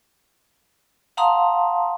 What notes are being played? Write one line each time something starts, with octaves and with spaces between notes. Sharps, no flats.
F5 F#5 A5 A#5 C6 D#6